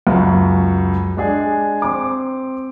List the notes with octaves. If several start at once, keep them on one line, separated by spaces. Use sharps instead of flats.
C#2 F#2
G#3 D4 G#4
C4 D6